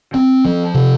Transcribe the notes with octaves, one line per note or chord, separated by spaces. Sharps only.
C4
F3
C3